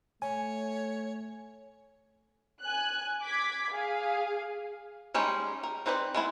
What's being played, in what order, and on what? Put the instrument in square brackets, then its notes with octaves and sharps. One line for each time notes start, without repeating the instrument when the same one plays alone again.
[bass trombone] A3 [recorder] C#5 [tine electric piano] G#5
[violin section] G#5 F#6
D6 G#6 B6
G#4 F5
[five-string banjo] G3 G#3 C#4 D#4
A#4
C4 D#4 B4 C5 D5
G#3 B3 E4